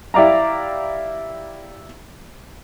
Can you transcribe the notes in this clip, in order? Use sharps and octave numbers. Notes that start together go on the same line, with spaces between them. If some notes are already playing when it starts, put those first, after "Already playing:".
E4 G4 D5 F5 A#5